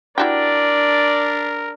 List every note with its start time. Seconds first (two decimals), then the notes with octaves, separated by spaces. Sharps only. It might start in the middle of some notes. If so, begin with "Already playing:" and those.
0.18 D4 E4 F#4 G4 A#4 D5